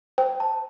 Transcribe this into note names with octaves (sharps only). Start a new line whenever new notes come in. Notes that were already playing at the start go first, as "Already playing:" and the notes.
C5 G5
A5